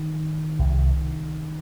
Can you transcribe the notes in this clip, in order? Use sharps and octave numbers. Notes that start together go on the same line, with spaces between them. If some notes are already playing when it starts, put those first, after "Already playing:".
Already playing: D#3
C2 C3